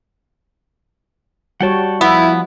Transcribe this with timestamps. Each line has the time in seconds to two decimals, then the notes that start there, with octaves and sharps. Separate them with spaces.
1.61 G3 F#4 C#5 F#5 G5 A5
2.01 F3 B3 E4